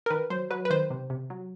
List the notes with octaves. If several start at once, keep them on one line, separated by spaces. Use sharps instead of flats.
A#4
D#3 B4
F#3 C5
F#3 B4
B4
D#3 C5
C3
C3
F#3